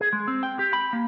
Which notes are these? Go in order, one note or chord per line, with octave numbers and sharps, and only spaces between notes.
G#4
G#3
C4
G5
G4
B5
A#3